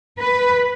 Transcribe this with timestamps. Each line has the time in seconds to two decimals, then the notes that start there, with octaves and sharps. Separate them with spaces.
0.19 B4